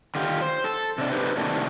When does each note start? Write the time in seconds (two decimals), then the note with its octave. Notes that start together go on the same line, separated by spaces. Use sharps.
0.15 D3 D#3 F4 G4
0.41 C5
0.64 A4
0.98 C3 D4
1.12 D#4 G4 B4 C5
1.37 A2 C3 D#3 A#3 D4